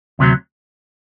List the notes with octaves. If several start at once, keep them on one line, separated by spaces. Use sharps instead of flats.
D2 C3 D#3 F#3